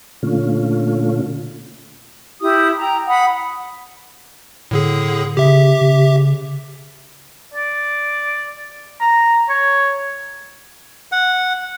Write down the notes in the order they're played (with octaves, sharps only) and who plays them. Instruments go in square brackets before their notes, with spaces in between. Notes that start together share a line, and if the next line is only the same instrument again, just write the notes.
[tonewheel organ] A#2 D3 A3 C#4 F4
[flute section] E4 G4 D#6
G5 A#5
F#5 B5 D#6
[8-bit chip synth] A2 D3 G#4
[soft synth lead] C#3 [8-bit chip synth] G4 E5
[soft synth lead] C#3
[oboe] D5
A#5
C#5
[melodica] F#5